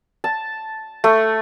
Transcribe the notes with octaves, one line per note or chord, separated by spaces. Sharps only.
A5
A3